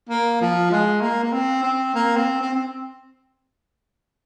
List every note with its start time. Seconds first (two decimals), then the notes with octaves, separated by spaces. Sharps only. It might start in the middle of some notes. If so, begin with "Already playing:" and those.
0.09 A#3
0.41 F3
0.71 G#3
1.02 A#3
1.24 A#3
1.33 C4
1.63 C4
1.95 A#3
2.17 C4
2.41 C4
2.53 C4